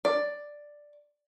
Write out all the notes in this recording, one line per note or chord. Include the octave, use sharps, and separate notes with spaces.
D5